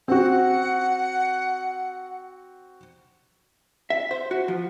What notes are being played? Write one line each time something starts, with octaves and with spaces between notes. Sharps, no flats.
C4 F#4 F#5
E5
C5
F#4
F3